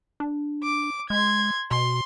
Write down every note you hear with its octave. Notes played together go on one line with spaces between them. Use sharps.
D4
D6
G#3 C6 G#6
B2 C6